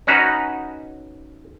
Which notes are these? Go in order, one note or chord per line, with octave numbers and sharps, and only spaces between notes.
C#4 D#4 F#4 B4